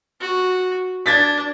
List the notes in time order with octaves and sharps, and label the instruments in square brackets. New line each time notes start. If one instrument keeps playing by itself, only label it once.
[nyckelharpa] F#4
[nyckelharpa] D4 [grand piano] G#6 A6 B6